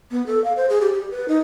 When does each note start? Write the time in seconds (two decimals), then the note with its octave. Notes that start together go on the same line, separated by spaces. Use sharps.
0.11 B3
0.27 A4
0.44 F5
0.57 C5
0.70 G#4
0.81 G4
0.94 G4
1.11 B4
1.28 D#4